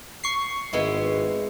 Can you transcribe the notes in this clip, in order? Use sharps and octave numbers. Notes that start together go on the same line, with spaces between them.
C#6 C7
G#1 G#3 B3 E4